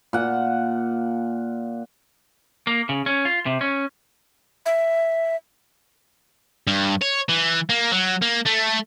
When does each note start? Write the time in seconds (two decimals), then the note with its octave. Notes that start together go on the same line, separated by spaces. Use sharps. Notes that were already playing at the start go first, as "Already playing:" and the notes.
0.13 A#2 F#5
2.67 A#3
2.89 C#3
3.06 C#4
3.25 F4
3.46 C3
3.61 C#4
4.66 E5
6.67 G2
7.02 C#5
7.29 E3
7.69 A#3
7.92 F#3
8.22 A#3
8.46 A3